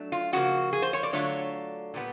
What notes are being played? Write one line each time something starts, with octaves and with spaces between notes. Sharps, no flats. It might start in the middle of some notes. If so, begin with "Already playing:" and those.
Already playing: F#3 A3 D4
F4
C#3 F3 A#3 F#4
G#4
C5
C#5
D5
D3 F#3 A3 D4 F4 C#5
A#2 G3 B3